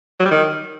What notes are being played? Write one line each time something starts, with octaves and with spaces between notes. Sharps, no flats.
F#3
G3
D#3